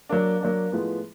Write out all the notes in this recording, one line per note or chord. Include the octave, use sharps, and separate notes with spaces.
F#3 A#3 D4
F#3 A#3 D4
A2 F3 G#3 B3